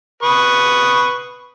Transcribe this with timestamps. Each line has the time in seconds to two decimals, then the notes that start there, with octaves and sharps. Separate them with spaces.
0.23 B4 C#6 D#6